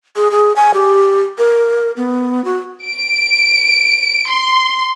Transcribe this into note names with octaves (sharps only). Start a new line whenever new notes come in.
G#4
G#4
G#5
G4
A#4
B3
F#4
D7
C6